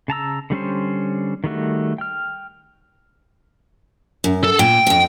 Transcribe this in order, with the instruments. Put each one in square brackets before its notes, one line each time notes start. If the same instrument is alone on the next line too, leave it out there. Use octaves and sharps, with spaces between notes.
[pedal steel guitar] C#3 A5 A#5 E6
D3 G3 C#4 C5
D#3 G3 A3 F#4
G5 F6
[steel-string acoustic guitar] F#2
[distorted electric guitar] A4
[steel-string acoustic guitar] A#2 [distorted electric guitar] G5
[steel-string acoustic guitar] F2 G#2